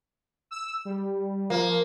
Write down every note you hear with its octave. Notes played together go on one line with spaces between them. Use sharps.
E6
G3
F3 A#3